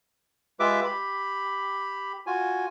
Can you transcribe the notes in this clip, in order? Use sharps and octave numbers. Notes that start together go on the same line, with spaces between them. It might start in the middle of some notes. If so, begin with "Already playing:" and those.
G#3 F4 G4 B4 E5 D6
G4 B5
F4 F#4 G#5